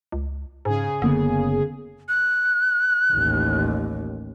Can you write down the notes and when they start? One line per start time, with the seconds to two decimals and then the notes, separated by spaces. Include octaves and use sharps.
0.12 C#2
0.65 G#2 C#3 G#4
1.02 F#1 D3 A#3 B3
2.09 F#6
3.13 A1 D#2